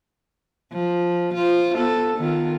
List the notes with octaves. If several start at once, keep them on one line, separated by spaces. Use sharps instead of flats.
F3
F4 C5
B3 A4
D#3 B3 F4